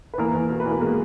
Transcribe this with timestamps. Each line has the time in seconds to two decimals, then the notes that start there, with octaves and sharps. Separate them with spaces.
0.14 B4
0.18 E2 A#3 A#4
0.35 E2
0.50 B2 A#4
0.60 B4
0.65 E2
0.71 A#3 A#4
0.81 G#3 A#3 A#4